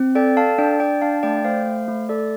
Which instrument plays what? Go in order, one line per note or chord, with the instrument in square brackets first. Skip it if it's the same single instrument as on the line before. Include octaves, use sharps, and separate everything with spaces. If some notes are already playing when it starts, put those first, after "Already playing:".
Already playing: [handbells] C4
A4 D5 G5
A4 F5 A5
D4 D5 G5
D4 D5 G5
D4 F5 A5
A3 D5 G5
G5
A3 C5 F5
A3
A3
A4 D5